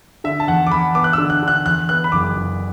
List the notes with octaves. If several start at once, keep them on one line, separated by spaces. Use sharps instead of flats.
D3 E5
A5
E2 F#5
D6
E2 B5
B3 D6
F#6
D3 E6
F#6
D3 F#6
E2 F#6
B3 F#6
B5
F#1 D6
F#1